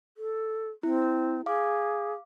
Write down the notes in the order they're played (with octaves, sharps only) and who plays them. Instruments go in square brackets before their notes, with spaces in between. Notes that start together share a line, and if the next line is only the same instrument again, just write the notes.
[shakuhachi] A4
[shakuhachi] C4 [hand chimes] E4
[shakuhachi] G#4 [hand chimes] F5 D6